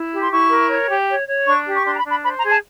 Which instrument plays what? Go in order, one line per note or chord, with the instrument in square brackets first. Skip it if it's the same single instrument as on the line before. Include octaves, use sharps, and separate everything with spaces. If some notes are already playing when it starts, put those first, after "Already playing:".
Already playing: [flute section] E4
G4
C6
E4 C#6
A#4
C#5
G4
C#5
C#5
D4 C#6
G4
C#6
D4 C6
A#5
B5
D4
B5
C5 B5
A#5
G#4
A5